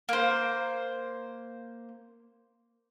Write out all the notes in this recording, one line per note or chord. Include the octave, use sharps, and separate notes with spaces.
A#3 C5